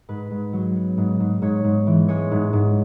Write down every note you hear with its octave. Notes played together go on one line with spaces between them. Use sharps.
G#2 B4
G#2
F#3
B3
G#2
G#2
G#2 C#5
G#2
E3
G#3 C#5
G#2
G#2